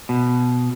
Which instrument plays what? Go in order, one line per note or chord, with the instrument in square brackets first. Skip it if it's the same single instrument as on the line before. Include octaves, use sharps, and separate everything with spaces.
[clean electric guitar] B2